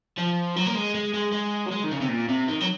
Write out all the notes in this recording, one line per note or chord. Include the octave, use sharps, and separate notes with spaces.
F3
F#3
A#3
G#3
G#3
G#3
G#3
F#3
G#3
D#3
C#3
C3
A#2
C3
D#3
F#3